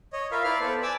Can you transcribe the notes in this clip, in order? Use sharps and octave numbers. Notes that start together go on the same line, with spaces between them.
C#5 D#5
F4 A#4 B4 E5 F5
E4 B4 D5 F5 F6
B3 A4 B4 C5 D5
D5 G#5 A5 D6 E6